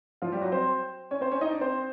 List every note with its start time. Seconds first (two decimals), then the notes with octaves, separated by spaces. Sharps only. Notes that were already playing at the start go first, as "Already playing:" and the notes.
0.22 F3 F4
0.32 G3 G4
0.41 F#3 F#4
0.52 C4 C5
1.11 C#4 C#5
1.21 C4 C5
1.31 C#4 C#5
1.41 D#4 D#5
1.51 D4 D5
1.61 C4 C5